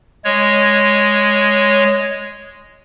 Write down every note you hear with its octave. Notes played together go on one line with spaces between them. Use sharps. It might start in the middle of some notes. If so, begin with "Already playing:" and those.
G#3 C#5